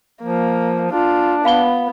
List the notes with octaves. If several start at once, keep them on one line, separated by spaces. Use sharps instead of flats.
F3 A#3
D4 F4
B3 F5 B5 G7